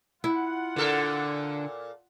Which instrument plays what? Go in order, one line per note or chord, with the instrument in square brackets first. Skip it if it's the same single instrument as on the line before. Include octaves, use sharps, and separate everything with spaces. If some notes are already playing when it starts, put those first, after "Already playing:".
[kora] E4 [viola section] F4 F#5
[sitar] A#2 A4 A#4 [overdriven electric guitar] D3